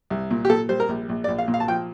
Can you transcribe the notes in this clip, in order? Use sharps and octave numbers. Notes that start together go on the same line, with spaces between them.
C2
A#2
G4
A#2 A4
G3 C5
A#4
A#1
A#1
D5
A#1
F5
A#2
F5
A5
F3 G5